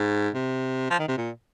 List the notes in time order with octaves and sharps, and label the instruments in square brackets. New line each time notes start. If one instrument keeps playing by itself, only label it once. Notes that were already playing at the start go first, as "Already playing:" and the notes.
Already playing: [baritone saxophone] G#2
C3
F3
D#3
C3
A#2